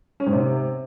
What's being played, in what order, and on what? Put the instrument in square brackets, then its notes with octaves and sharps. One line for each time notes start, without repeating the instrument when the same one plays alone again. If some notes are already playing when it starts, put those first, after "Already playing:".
[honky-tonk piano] C#4
G#2
C3